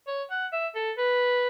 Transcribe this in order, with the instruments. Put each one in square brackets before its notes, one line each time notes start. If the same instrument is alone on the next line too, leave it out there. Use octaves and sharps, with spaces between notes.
[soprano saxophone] C#5
F#5
E5
A4
B4